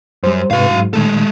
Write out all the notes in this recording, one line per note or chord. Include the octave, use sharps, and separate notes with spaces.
F#2 G3 C5
G#2 C3 F#4 B4 F5
G#2 F#3
A#2 D#3 G#3 A3 A4